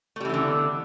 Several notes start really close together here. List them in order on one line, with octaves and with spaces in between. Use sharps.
A3 G3 E3 B3 D3